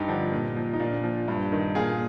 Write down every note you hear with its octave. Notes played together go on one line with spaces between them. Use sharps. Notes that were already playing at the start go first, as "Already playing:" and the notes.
Already playing: G2 D#4 G4
D3 F3
A#2
F3
D#4
A#2 D4 F4
F3
G2
D#3
A#2 F4 G#4